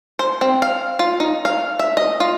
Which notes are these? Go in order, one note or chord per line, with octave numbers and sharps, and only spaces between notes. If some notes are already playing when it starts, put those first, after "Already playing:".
C5
C4
F5
F4
D#4
F5
E5
D#5
F4